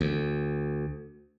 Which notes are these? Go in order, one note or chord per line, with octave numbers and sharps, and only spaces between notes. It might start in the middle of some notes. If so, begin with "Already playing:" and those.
D2